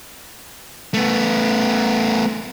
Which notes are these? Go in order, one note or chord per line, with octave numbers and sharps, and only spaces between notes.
A3 B3